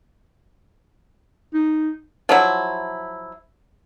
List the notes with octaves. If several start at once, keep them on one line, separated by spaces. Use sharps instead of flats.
D#4
F3 F#3 E4